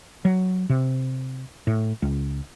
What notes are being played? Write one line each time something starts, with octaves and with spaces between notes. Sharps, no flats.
F#3
C3
A2
C#2